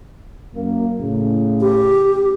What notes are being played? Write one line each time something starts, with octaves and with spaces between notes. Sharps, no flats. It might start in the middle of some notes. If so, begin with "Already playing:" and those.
F#2 A#3
A2 C#3
G4